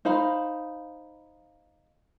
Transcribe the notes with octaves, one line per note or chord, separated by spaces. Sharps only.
D#4 C5 F5 B5